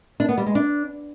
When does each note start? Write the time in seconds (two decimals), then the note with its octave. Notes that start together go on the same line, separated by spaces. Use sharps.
0.20 D4
0.29 B3
0.38 G3
0.46 G#3
0.55 D4